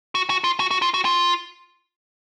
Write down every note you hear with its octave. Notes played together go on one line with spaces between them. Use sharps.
F#4
F#4
F4
F#4
F#4
F4
F#4
F4